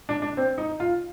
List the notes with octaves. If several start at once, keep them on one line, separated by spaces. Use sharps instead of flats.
D4
D4
C4
D#4
F4